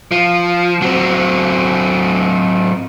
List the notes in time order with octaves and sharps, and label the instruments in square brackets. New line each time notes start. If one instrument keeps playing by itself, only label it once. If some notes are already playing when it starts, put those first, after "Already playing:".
[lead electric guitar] F3
F#3 C4